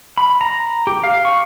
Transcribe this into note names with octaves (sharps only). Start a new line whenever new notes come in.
B5
A#5
G4
F5
C#6